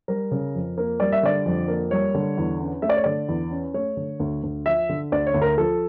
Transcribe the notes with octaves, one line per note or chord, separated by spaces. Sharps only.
G3 A#4
C#3
F2
A#3
G3 D5
E5
D3 D5
F2
A#3
G3 C#5
D3
E2
C#4
A3 E5
D5
C#5
D3 D5
E2
C#4
A3 C#5
D3
D2
D2
F3 E5
D3
D2 D5
C#5
D2
A#4
F3 A4